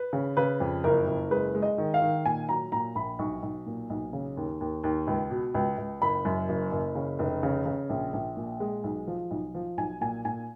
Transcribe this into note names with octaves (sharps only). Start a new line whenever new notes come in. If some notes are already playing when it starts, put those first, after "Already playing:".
Already playing: B4
C#3
C#3 B4
F2
F#1 A#4
F#1
G#3 B4
G#3
D#5
D#3
F5
D#3
A#2 G#5
F#3 A#5
A#2 A#5
A#1 B5
B1 C#6
B1
A#2
B1
C#3
D#2
D#2
D#2
C#2
B2
C#2
C#2
F#1 B5
F#2
F#1
F#1
C#3
F1
C#3
C#3
A#1
A#1
A#2
G#3
B1
F3
B1
F3
B1 G#5
A#2 G#5
A#2 G#5